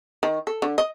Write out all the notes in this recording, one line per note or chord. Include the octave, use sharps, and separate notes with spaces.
D#3
A4
D3
D#5